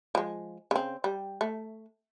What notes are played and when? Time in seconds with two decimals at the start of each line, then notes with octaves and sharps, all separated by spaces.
0.15 F3 G#3
0.71 C#3 C4
1.04 G3
1.41 A3